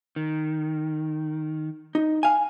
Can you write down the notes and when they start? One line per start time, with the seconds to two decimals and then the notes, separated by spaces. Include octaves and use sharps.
0.16 D#3
1.95 D#4
2.23 F5 G#5